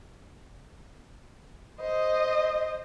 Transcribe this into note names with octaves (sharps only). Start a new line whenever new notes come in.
C5 D#5